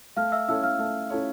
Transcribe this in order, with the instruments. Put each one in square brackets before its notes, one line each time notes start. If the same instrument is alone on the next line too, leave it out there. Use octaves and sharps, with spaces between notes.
[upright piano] A3 [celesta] F5 F6
[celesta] E5 E6
[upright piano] C#4 E4 A4 C#5 [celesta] E5 E6
[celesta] F5 F6
[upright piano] A3
C#4 E4 A4 C#5